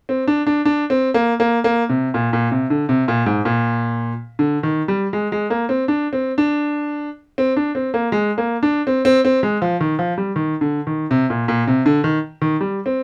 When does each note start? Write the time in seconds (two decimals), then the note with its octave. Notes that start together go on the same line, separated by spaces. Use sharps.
0.09 C4
0.28 D4
0.47 D4
0.65 D4
0.90 C4
1.14 A#3
1.40 A#3
1.64 A#3
1.89 C3
2.14 A#2
2.33 A#2
2.52 C3
2.70 D3
2.89 C3
3.08 A#2
3.26 G#2
3.45 A#2
4.39 D3
4.63 D#3
4.88 G3
5.13 G#3
5.32 G#3
5.50 A#3
5.69 C4
5.88 D4
6.13 C4
6.38 D4
7.38 C4
7.57 D4
7.75 C4
7.94 A#3
8.12 G#3
8.38 A#3
8.63 D4
8.87 C4
9.05 C4
9.25 C4
9.43 G#3
9.62 F3
9.80 D#3
9.99 F3
10.18 G3
10.36 D#3
10.61 D3
10.87 D#3
11.11 C3
11.30 A#2
11.48 A#2
11.67 C3
11.86 D3
12.04 D#3
12.42 D#3
12.61 G3
12.86 C4